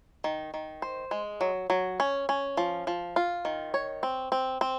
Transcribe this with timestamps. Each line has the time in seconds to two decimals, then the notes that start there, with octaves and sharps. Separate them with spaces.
0.24 D#3
0.54 D#3
0.82 C5
1.11 G#3
1.41 F#3
1.70 F#3
2.00 C#4
2.29 C#4
2.57 F3
2.87 F3
3.16 F4
3.45 D#3
3.74 C#5
4.03 C4
4.32 C4
4.61 C4